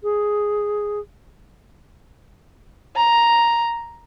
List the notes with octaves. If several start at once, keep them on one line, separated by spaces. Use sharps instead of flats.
G#4
A#5